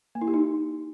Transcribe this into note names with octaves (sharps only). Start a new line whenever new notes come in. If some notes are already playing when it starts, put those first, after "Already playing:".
A#3
E4
G4
D#4